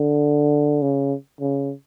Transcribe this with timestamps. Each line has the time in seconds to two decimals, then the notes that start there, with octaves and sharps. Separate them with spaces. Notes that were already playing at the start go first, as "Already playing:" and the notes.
Already playing: D3
0.82 C#3
1.41 C#3